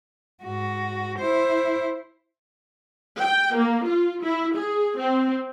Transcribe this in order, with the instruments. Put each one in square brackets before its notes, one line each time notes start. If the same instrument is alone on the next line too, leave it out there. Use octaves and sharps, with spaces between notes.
[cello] G#2 F#4
E4 C5
[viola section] G5
A#3
F4
E4
G#4
C4